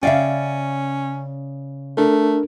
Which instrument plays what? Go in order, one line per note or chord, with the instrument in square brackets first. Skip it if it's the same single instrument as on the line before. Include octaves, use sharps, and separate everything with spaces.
[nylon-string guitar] C#3 D5 [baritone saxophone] C#4 [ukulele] E5 F5 G5
[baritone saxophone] A3 [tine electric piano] D4 A4 A#4